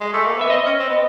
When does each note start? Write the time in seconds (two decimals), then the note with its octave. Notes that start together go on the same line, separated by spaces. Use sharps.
0.00 G#3
0.13 A3
0.25 A#3
0.38 B3 E5
0.50 C4 D#5
0.66 C#4
0.80 C4
0.89 B3